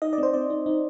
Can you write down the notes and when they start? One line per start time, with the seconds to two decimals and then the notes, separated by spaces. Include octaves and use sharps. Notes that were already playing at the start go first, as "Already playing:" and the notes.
0.02 D#4 D#5
0.13 D5
0.18 C4 C5
0.33 C4 D5
0.50 D#4
0.66 D#4